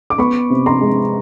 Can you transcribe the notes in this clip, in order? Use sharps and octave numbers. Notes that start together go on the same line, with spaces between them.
D6
B3 B5 C#6
C3
A#5 C6
G#3